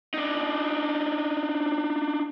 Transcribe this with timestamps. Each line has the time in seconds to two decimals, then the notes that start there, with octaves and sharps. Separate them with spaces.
0.14 D4 D#4